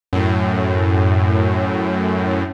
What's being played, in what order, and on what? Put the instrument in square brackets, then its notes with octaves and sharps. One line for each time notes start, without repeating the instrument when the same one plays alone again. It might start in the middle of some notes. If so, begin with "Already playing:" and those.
[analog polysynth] F#2 A2